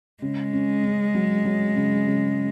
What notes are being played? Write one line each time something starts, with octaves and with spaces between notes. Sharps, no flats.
C#3 G#3
C#4
C#4
F#3
F#3
C#3
C#3